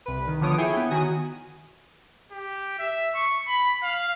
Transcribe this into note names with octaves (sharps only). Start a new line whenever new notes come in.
C2 B4
D#3
D3 F3 B3 C#5 D#6 D7
E4 G#4 C#5 G5 G#5
B3
D#3 F#4 G#5 D#6
G4
E5
C#6
B5
F5